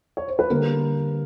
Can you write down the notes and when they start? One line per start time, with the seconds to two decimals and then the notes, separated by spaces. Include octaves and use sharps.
0.17 C#5
0.28 C5
0.39 B4
0.50 D3 G3 A#3 A#4